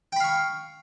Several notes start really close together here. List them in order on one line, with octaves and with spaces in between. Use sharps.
G5 B5 F5 C#6